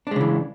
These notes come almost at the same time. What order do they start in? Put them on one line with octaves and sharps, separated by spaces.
D4 G#3 C#3 E3